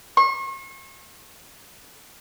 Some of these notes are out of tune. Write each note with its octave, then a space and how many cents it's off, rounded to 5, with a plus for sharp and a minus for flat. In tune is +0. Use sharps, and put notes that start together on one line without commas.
C#6 -40